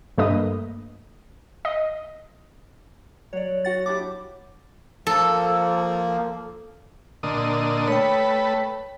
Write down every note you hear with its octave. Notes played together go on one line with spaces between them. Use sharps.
G2 A3 A#3 B4 D#5 D#6
D#5
F#3 C#5 D5
F#4 F#5 A6
D4 E4 G4 D6
F3 A#3 A4
A#2 D3 D#5
A3 B4 C#5 G5